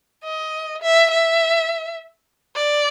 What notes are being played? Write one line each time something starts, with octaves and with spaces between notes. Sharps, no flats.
D#5
E5
E5
D5